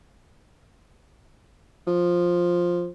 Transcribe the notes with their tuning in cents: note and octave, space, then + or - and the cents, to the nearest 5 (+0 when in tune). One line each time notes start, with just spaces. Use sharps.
F3 +5